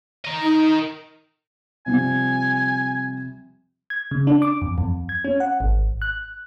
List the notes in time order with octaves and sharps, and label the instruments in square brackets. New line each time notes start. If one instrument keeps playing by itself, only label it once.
[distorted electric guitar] A#4 D#5
[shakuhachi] D#4
[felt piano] C3 F3 G3 [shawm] G#5
[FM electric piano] G#6
C#3
D4
D6
F2
F2
G#6
C#4
F#5
G#1
F#6